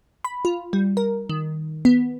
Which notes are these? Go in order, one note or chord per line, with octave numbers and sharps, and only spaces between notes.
B5
F4
G3
A#4
D#3
B3